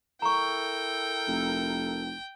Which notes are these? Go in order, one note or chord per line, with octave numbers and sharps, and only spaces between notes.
E4 A4 A#4 G5 A#5 C#6
F1